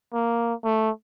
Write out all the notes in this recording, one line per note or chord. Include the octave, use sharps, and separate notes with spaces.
A#3
A3